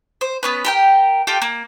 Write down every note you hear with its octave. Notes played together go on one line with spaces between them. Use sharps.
C5
B3 C#4 B4
G4 A#4 G5
F4 G4 A4 G5
A#3